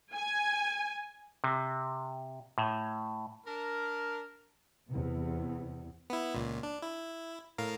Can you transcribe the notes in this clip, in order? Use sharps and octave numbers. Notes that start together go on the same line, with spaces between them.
G#5
C3
A2
D4 A#4
E2 C3
B3 E4
C#2 A#2
D4
E4
A2 A#4 F5